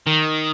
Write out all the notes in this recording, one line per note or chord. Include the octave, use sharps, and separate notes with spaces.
D#3